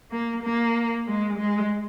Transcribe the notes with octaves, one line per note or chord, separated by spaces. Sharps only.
A#3
A#3
G#3
G#3